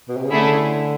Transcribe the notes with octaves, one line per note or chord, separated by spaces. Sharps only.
B2
C3
C#3
D3 A3 C#4 E4 G#4